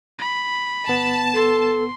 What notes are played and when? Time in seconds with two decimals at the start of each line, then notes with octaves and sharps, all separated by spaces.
0.19 B5
0.88 G1 B3 A5
1.34 A4 C6